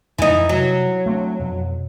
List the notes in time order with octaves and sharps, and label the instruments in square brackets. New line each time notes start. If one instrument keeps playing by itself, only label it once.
[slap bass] F2 C#3 [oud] E3 D#4
[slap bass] C3 G3 [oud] F#3
[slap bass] A3 C4 D4
F2 B2